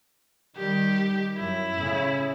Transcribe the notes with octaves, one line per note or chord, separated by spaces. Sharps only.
D#3 G3 G4
F#2 E4
A2 C#3